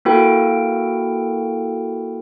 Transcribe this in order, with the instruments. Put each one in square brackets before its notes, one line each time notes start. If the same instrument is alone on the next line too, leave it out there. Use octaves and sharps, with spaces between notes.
[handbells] A#3 E4 F#4 A4 A#4 G5